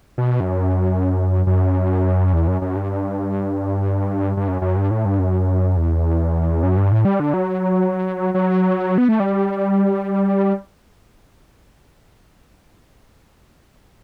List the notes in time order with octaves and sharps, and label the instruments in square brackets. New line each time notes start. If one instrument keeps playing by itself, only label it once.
[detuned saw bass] B2
F#2
F#2
E2
F#2
F#2
G2
G2
F#2
F#2
G2
A2
G2
F#2
E2
F#2
G2
A2
G3
D3
F#3
F#3
B3
A3
G3